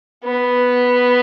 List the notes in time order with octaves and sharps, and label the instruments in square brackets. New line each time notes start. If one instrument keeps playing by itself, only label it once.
[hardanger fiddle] B3